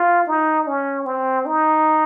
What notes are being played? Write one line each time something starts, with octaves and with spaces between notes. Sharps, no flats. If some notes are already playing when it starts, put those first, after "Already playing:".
Already playing: F4
D#4
C#4
C4
D#4